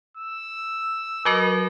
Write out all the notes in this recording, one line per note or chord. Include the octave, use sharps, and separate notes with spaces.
E6
F#3 F#4 A#4 D#5